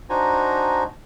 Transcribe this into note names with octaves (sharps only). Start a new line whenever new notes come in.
D4 D#4 F#4 C5 G#5 A#5